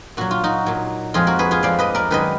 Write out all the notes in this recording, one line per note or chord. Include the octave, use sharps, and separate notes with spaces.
A#2 F#3 F#4
F4
D#4 F#4
A#2 F#3
F2 F3 G#3 F4 G#4
F#4 A#4
G#4 B4
F4 G#4
F2 F3 G#3 D5 F5
B4 D#5
A#4 D5
F#2 D#3 G#3 B4 D#5